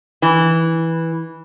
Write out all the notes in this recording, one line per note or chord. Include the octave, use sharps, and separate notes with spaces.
E3